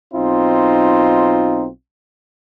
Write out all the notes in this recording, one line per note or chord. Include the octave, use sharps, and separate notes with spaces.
B1 C4 D#4 F4